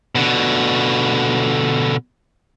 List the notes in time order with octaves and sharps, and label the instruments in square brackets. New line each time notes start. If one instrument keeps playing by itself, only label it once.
[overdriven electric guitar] B2 D3